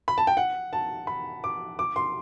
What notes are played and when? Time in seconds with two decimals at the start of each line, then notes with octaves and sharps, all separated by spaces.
0.08 B5
0.18 A5
0.27 G5
0.37 F#5
0.73 A5
1.07 B5
1.44 D6
1.79 D6
1.96 C6